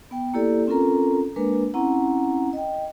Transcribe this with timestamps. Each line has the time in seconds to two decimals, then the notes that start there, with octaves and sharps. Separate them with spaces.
0.11 B3 G5
0.34 A#3 E4 G4 A4 D5
0.67 C4 C#4 F4 A4 A#4 A#5
1.36 G#3 A#3 D4 A#4 B4
1.74 C4 C#4 E4 F#5 A#5
2.53 D#5 G5